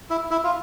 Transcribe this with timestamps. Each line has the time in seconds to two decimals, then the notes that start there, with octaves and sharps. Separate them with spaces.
0.10 E4
0.31 E4
0.44 F4